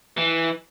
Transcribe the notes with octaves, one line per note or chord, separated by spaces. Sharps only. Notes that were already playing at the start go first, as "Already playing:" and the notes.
E3